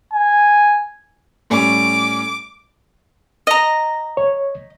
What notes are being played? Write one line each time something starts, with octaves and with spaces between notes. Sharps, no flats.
G#5
A2 G3 C#4 D6
D#5 A#5
C#5